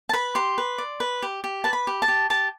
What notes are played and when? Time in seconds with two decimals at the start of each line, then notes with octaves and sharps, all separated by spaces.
0.09 A5
0.13 B4 B5
0.35 G4 C6
0.58 B4
0.78 D5
1.00 B4
1.22 G4
1.44 G4
1.64 B4 A5
1.73 B5
1.87 G4
2.02 A5
2.08 G4
2.30 G4 A5